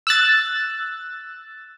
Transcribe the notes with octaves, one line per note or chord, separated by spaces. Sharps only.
E6 F#6 A6